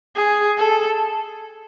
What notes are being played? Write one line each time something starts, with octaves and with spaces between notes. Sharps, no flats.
G#4
A4